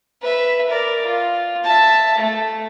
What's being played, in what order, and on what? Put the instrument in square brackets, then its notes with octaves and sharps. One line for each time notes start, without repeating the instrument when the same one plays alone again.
[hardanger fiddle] B4 E5
A#4 D5
F4
E5 A5
A3